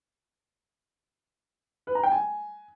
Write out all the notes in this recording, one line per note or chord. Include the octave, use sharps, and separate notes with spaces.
B4
A#5
G5
G#5